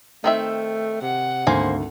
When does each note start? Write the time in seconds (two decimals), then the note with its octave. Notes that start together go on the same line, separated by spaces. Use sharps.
0.24 D#3 A3 C4 E5
1.02 C3 F#5
1.47 G#1 D2 A#3 C5 G#5